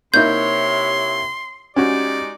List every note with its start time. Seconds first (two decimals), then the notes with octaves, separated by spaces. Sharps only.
0.14 C3 A#3 D#4 E4 C#5 C6 G6
1.76 G#3 C#4 D#4 F#4 G4 D5